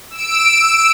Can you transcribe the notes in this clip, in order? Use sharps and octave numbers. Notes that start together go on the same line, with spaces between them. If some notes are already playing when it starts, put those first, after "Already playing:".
E6 D7